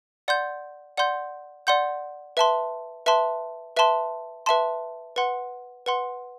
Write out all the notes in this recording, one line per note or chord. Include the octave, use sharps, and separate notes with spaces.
D5 F#5 C6 G6
D5 F#5 C6 G6
D5 F#5 C6 G6
B4 E5 A5 C6
B4 E5 A5 C6
B4 E5 A5 C6
B4 E5 A5 C6
B4 F#5 C6
B4 F#5 C6